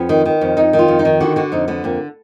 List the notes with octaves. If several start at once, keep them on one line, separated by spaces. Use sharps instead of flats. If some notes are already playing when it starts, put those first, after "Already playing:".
Already playing: F2 B3
D#3
D#3
F2
F2 D#4
D#3
F4
F2
D#4
D#3
D3 F#4
D3 F#4
F2 D#4
D3 B3
F2 A#3